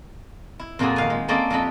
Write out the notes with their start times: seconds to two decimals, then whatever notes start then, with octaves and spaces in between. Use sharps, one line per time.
0.60 E4
0.79 F2 A#2 F3 F#4 G#4
0.96 D#3 F5 G#5
1.10 G#3
1.28 A3 A#3 C4 C#4 D5 D#5
1.50 F2 D4 G4 D#5 B5